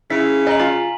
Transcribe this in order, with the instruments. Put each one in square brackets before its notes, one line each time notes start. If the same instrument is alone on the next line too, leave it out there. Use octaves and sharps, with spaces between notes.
[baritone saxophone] C#3 [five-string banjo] E4 [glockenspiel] B6
[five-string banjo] D#5 [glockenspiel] G#5 A#5 F#7
[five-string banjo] F4